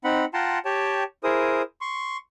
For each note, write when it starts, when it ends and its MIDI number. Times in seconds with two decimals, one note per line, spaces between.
0.04 0.25 60
0.04 0.25 63
0.04 0.25 78
0.04 0.25 83
0.34 0.59 65
0.34 0.59 78
0.34 0.59 79
0.34 0.59 81
0.34 0.59 82
0.34 0.59 84
0.65 1.03 67
0.65 1.03 73
0.65 1.03 79
0.65 1.03 81
1.24 1.62 64
1.24 1.62 68
1.24 1.62 70
1.24 1.62 72
1.24 1.62 87
1.81 2.17 84
1.81 2.17 85